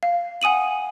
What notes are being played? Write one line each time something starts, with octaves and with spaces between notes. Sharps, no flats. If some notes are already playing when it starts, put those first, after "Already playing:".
F5
F#5 G#5 D#6 D#7 F#7